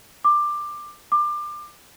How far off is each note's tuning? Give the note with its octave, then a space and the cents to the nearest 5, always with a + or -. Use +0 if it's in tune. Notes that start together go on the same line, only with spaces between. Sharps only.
D6 +15
D6 +25